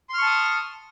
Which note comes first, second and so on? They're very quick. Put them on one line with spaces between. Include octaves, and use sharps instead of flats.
C6 F6 C#6 A5 D#6